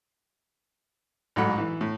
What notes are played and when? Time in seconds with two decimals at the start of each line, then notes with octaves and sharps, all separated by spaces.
1.36 A1 G#2 F#3 F#5 B5
1.58 E3
1.81 A2